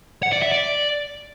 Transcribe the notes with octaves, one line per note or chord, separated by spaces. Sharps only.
F#5
D5
E5
D5